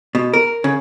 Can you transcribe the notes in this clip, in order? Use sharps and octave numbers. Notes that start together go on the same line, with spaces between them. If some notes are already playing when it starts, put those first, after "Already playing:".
B2
A#4
C#3